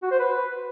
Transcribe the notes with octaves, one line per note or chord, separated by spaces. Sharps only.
F#4
C5
B4